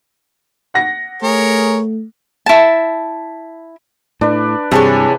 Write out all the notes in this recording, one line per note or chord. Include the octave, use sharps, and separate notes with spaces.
F#5 A#6
A3 G#4 A#4 C#5
E4 A5
A2 D4 B4
G2 C3 E3 G#3 C#5 A5